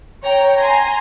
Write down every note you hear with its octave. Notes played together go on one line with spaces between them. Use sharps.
C#5 G5 A#5
G#5 A#5 C6